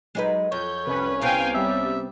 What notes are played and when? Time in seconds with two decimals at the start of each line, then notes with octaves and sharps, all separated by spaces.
0.15 F#3 G#3 D#4 B4
0.52 F2 C#5 G6
0.86 C2 C#4 B4
1.21 C3 B3 C4 F5 G5 G#5
1.54 G3 E5